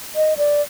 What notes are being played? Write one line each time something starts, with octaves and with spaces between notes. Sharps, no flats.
D#5
D5